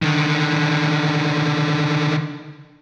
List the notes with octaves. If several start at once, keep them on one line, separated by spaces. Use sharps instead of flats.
D3 D#3